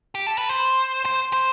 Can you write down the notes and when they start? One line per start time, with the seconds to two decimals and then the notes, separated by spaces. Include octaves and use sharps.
0.15 G4
0.27 A4
0.38 B4
0.50 C5
1.05 C5
1.33 C5